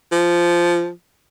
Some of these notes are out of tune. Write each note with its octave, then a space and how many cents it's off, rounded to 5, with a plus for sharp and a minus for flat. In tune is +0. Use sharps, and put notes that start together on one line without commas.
F3 -10